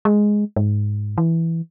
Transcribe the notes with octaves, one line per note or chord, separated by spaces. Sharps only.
G#3
G#2
E3